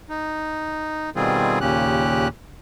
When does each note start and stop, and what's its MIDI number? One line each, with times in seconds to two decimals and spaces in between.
0.09 1.10 63
1.16 1.59 47
1.16 1.59 51
1.16 1.59 55
1.16 1.59 60
1.16 1.59 65
1.16 1.59 68
1.61 2.28 39
1.61 2.28 46
1.61 2.28 49
1.61 2.28 61
1.61 2.28 67
1.61 2.28 90